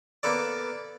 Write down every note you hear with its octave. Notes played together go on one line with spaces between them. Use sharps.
A#3 B3 A4 D5